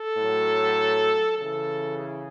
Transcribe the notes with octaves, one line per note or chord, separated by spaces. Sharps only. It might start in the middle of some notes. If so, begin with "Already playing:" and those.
Already playing: A4
A2 F#3
C#3 E3 A4
G#4